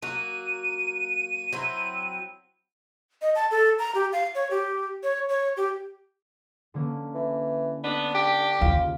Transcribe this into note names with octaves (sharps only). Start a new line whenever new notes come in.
F#3 A#3 F#4 D#7
F#3 C4 E4
D#5
A5
A4
A#5
G4
F5
C#5
G4
C#5
C#5
G4
D3 A#3 C#4
E3
B3 D4
G4
D#2 C#3 F4